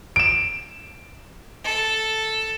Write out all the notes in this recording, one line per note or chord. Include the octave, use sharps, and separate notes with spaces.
D7 E7
A4